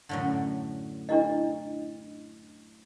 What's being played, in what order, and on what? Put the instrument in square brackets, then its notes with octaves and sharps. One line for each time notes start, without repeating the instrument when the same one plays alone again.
[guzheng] F#2 A2 D3
[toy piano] D4 E4 D#5